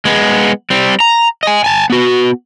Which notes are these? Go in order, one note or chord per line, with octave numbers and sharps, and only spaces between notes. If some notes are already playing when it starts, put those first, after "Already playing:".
G#3 B3
G3 C4
A#5
D#5 G#5
G#5 A5
B3 F#4